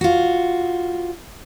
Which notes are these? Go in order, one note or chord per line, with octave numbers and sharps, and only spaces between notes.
F4 F#4